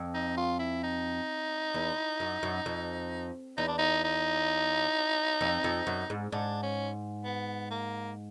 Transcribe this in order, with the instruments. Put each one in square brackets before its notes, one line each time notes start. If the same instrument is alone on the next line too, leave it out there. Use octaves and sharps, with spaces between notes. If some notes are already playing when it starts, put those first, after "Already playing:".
Already playing: [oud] F2
[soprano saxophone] D#4
F4
E4
D#4
[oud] E2
F#2
F#2
F2
[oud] E2 [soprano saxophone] D#4
[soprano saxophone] D4
D#4
D#4
[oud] F2
F2
F#2
G#2
[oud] G#2 [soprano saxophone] D4
[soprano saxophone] C#4
B3
A#3